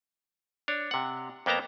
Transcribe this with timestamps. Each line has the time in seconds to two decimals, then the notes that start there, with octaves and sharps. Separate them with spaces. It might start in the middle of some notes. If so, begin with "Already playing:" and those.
0.68 D4 C#5
0.91 C3 F#5
1.46 F2 A#3 B3 G5 A5 A#5